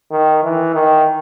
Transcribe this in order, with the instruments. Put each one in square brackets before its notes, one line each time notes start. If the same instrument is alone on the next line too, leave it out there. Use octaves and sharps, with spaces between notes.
[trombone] D#3
E3
D#3